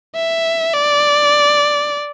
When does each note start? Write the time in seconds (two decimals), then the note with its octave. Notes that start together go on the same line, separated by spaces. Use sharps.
0.16 E5
0.74 D5